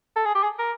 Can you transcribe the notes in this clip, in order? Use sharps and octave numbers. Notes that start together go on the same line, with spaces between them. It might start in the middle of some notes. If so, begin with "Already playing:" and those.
A4
G#4
G4
G#4
A#4